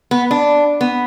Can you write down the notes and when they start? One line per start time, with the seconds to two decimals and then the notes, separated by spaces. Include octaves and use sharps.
0.11 B3
0.31 D4
0.81 B3